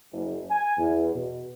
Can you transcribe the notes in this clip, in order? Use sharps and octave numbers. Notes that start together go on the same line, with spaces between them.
F#1
G#5
E2
B2